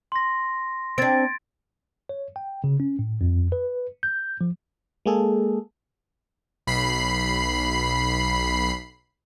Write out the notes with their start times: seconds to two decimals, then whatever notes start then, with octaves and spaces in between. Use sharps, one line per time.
0.12 C6 A#6
0.98 C4 D4 G#6 A6 D7
2.09 C#5
2.36 G5
2.64 C#3
2.80 C#4
2.99 A2
3.21 F2
3.52 B4
4.03 G6
4.41 F3
5.06 G#3 A#3 G#4 A4
6.67 B1 B5 C7